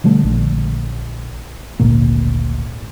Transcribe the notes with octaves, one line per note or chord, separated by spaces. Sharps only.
B2 D3 G3 A3
A#1 D3
G#1 D2 A#2 A#3